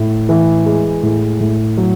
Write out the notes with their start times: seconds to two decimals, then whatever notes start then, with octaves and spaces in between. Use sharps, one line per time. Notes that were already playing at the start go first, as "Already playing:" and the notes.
Already playing: A2
0.29 E3
0.66 G#3
1.03 A2
1.40 A2
1.77 F#3